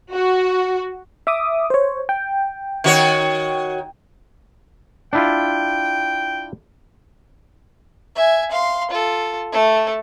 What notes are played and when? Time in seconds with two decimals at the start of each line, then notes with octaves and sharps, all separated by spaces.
0.13 F#4
1.27 E5 D6 D#6
1.70 C5 C#5
2.09 G5
2.84 D#3 F#4 C#5
5.13 D4 E4 F4 G5
8.15 E5 G#5
8.51 F5 C6
8.91 F4 A4
9.52 A3 A4